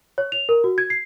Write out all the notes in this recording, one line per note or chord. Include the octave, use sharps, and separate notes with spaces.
C#5
F7
A#4
F#4
G#6
C7